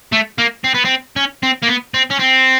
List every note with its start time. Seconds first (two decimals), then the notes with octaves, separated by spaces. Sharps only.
0.12 A3
0.38 A#3
0.64 C4
0.74 B3
0.85 C4
1.16 C#4
1.43 C4
1.62 A#3
1.68 B3
1.94 C4
2.11 C#4
2.20 C4